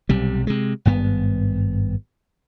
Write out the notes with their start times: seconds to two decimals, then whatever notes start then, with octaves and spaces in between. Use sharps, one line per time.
0.09 B1 C3 G3
0.47 C3 G#3
0.85 G#1 G2 B3